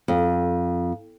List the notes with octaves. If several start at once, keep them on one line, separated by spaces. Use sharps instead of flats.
F2